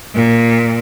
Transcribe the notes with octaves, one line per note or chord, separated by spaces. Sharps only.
A#2